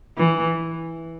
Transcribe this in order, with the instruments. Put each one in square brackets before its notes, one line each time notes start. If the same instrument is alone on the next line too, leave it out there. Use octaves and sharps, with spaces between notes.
[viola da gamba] E3